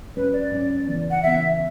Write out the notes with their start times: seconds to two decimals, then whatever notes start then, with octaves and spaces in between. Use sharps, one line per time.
0.16 G#2 F#3 C#4 B4
0.33 D5
0.51 G#2 F#3 C#4
0.87 C#3 E3 B3
1.11 F#5
1.23 C#3 E3 B3 E5